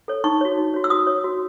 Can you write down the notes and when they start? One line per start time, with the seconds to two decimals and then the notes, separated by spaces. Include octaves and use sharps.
0.08 A4 C#5
0.24 D#4 C#6
0.41 F#4 C#5
0.58 D#4
0.74 F#4 C#5
0.84 E6
0.90 F#4 D#6
1.07 C#5
1.24 F#4